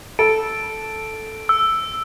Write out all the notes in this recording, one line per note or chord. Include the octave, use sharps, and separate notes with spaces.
A4 D7
E6